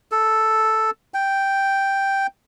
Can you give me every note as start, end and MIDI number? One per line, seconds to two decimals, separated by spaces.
0.12 0.91 69
1.14 2.27 79